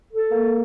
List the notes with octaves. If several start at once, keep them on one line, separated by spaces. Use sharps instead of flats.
A4
A#3